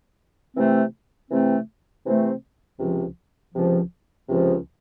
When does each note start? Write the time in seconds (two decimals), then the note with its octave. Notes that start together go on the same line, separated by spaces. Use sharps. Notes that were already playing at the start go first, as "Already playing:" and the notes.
0.56 C3 E3 A3 C4
1.30 C3 E3 A3 C4
2.05 C3 E3 A3 C4
2.80 C#2 C3 F3
3.54 C#2 C3 F3
4.29 C#2 C3 F3